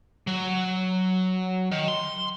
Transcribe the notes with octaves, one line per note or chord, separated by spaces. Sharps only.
F#3
D#3
C6